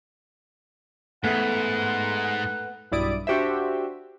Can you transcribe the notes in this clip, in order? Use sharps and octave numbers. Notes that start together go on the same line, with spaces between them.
G#2 A3 B3 F#5
B1 G2 E4 D5 D#6 D7
D4 F#4 G4 C5 E5